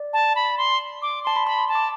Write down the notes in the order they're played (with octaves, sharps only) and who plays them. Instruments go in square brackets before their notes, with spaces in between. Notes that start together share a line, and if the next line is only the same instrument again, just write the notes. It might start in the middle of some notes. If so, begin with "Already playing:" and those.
Already playing: [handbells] D5
[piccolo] A5
B5
C6
D6
[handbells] A5 [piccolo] C6
[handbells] B5
[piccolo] B5 [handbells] C6
[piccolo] A5
[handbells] D6